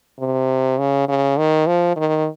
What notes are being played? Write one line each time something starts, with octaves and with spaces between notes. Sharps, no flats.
C3
C#3
C#3
D#3
F3
D#3